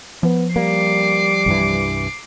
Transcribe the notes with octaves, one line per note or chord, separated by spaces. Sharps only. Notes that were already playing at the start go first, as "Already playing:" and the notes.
F3 B3
G3 A#3 D6 C7
C2 G2 E3